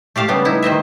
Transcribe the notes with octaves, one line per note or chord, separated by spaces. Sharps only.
A3 G4 F5 A5
C#3 G3 B3
D#4 E4
D#3 C5 D#5 E5